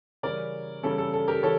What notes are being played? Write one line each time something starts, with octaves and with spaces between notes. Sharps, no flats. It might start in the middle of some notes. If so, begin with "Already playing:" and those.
C#3 E3 G3 C#4 A#4 D5
C#3 E3 G3 C#4 A4
A4
A4
G4 A#4
C#3 E3 A4 C#5